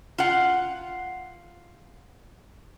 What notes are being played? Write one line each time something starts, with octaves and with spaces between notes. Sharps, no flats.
F4 F#5